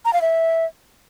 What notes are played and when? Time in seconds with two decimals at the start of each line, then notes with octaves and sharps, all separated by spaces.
0.05 A#5
0.13 F5
0.22 E5